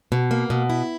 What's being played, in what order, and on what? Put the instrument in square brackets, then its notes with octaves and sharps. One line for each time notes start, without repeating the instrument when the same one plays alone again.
[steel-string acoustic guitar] B2
A#3
B2
E4